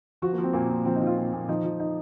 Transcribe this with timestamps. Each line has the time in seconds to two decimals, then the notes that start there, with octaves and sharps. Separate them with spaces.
0.22 F3 F#4
0.33 A#3
0.38 F3
0.44 C4
0.53 A#2 A#3
0.70 A#2
0.85 F3 C4
0.96 D#4
1.01 F3
1.07 F4
1.17 A#2
1.32 A#2
1.48 F3 D#4
1.64 F3
1.80 D#4